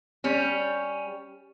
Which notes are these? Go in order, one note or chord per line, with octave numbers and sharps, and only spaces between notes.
G3 C#4